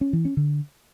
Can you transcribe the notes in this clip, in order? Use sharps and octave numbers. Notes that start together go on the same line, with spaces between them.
C#4
E3
C#4
D3